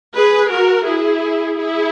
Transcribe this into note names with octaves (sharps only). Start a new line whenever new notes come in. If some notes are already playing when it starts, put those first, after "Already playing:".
G#4 B4
F#4 A#4
E4 G#4
E4 G#4